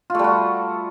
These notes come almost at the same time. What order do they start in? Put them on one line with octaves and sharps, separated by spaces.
F4 A3 G3 F#4